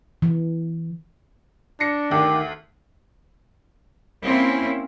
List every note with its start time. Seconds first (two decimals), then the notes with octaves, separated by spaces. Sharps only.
0.22 E3
1.80 D4 A#6 C#7
2.11 D2 D#3 G4
4.24 A#3 C4 C#4 E4